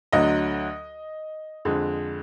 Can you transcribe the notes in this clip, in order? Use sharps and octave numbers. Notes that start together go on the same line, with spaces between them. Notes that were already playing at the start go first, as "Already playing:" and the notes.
D2 D3 F#3 D#5
F2 D3 G#3